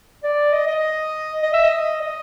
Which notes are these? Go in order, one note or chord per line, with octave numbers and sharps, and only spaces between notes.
D5
D#5
D#5
D#5
E5
D#5
D#5